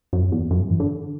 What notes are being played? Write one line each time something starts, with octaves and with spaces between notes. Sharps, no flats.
F#2
E2
F#2
G2
E3
D3